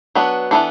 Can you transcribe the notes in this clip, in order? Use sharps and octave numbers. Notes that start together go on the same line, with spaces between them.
F#3 B3 D4 B4
E3 B3 D4 A4